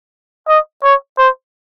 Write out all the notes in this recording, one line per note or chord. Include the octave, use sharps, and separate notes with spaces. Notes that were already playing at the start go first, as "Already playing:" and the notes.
D#5
C#5
C5